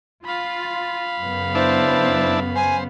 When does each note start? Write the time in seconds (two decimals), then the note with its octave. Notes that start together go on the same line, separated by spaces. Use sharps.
0.25 F4 F5 B5
1.22 F#2 C#3 B3
1.55 D4 E4 C5 A5
2.55 C5 G#5